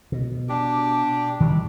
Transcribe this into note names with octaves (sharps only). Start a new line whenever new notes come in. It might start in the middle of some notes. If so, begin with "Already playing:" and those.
B2
D4 G4
D#3 E3 G3